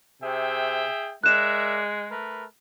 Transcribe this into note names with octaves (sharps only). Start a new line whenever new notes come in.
C3 G#4 E5 G5
G#3 A#4 D5 E5 F#6 E7
A3 A#4 B4